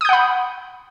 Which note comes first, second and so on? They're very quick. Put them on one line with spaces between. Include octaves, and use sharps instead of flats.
D#6 G6 F#5 B5